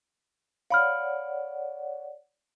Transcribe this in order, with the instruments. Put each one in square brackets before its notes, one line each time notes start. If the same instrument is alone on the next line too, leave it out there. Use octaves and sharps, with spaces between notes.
[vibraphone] C#5 D5 F#5 [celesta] F5 B5 F6